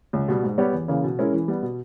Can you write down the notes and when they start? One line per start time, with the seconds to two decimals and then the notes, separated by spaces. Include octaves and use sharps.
0.13 C#2
0.28 B2 G3
0.43 G#2
0.58 G3 B3 G4 C#5
0.73 E2
0.88 C#3 E3 A#3
1.04 B2
1.19 G#3 C#4 E4 A#4
1.33 E3
1.48 G3 B3
1.63 B2